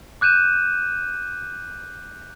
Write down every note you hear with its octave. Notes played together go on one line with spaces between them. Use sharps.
D6 F#6 G6 D#7 E7